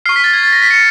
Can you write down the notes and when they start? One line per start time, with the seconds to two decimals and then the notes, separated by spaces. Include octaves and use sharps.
0.06 C#6 F6 C7
0.16 B6
0.24 A6
0.33 G#6
0.43 A6
0.52 A#6
0.62 B6
0.71 C#7